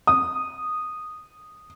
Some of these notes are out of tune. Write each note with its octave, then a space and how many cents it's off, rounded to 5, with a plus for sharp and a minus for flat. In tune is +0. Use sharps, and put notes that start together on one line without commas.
D#6 -10